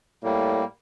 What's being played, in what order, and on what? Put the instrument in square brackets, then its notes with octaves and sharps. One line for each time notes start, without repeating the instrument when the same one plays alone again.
[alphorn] A2 [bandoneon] G3 A#3